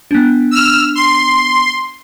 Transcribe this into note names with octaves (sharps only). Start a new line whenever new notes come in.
B3 D4
E6 F6
C6